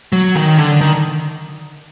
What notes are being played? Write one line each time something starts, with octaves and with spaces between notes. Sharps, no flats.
F#3
D#3
D3
D#3